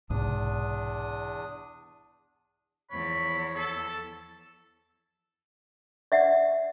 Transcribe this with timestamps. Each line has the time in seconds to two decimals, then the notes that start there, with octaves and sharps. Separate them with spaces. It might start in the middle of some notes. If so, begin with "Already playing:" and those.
0.10 B1 E2 G#2 C3 D4 D#6
2.91 E2 F3 C#5 B5
3.55 A4
6.12 D5 E5 F#5